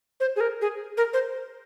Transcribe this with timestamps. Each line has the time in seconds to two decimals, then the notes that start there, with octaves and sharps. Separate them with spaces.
0.20 C5
0.36 G#4
0.41 A#4
0.61 G#4
0.97 A#4
1.13 C5